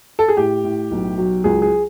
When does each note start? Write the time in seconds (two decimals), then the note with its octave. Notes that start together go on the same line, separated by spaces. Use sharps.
0.19 A4
0.28 G#4
0.37 A2 G4
0.64 A2
0.91 B1
1.18 F#3
1.44 C#2 G#4
1.62 G#4